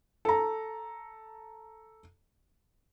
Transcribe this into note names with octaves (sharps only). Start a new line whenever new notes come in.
A4 A#5